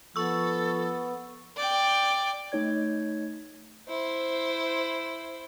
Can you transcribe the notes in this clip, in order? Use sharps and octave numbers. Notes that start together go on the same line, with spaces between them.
F3 B3 A4 C#6 E6
D5 G5
A3 D#4 C#5 G#6
E4 C5